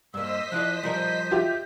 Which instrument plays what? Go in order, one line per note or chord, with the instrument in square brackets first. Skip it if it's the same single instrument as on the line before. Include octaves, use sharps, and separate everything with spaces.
[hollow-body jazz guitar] G2 A#3 [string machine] C5 D#5 B6 [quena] E6
[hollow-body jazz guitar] F3 E4 D5 [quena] F#6
[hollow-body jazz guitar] F3 G3 A#4 [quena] G6
[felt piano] F4 G4 E5